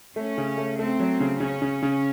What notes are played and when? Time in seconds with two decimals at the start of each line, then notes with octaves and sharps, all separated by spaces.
0.16 A3 C#4
0.38 C#3
0.58 A3
0.78 A3 C4
0.99 F#3
1.20 C#3
1.40 C#3 C#4
1.62 C#3
1.83 C#3